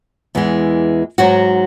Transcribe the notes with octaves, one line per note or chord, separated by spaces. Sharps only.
E2 E3 G#3
G#2 F#3 F#4